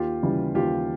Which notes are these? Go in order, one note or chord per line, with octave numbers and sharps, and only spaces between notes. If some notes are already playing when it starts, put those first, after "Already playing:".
Already playing: D#2 F4 G4
C#3 E3 G3
D#2 F4 G4